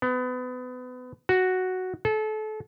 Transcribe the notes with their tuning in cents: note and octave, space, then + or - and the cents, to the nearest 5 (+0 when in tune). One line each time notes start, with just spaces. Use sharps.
B3 +30
F#4 +0
A4 -30